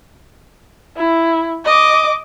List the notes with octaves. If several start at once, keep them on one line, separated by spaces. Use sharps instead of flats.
E4
D#5 D6